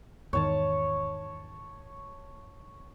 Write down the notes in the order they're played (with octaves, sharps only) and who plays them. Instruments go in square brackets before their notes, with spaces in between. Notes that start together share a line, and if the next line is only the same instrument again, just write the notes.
[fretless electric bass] E2 G#2 D#3 [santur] C#5 A5